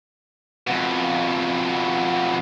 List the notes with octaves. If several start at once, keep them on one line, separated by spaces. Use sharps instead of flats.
F2 B2